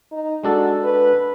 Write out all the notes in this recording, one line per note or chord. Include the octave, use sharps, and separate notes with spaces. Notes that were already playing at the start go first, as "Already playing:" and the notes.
D#4
G#3 D4 F#4 A4
B4